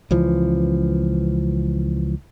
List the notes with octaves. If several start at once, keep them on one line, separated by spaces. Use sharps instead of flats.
C#2 E3 F3